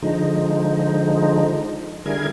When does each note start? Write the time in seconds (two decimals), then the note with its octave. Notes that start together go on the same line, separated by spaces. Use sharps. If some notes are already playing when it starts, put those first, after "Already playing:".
0.02 D3 F3 G#3 D#4
2.06 D3 G3 E4 G#4 A#4 G#6